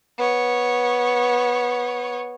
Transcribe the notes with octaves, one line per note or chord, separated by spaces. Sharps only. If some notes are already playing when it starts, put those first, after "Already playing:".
B3 C#5